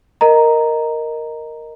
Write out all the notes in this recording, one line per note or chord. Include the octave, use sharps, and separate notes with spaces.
A#4 D#5 A#5